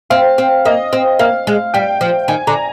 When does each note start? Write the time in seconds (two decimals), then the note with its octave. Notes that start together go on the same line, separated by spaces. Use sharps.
0.10 C4 F5
0.38 C4
0.65 A#3 D#5
0.93 C4
1.19 A#3 F5
1.47 G#3
1.74 G3 G5
2.01 F3
2.28 D#3 G#5
2.47 D3 A#5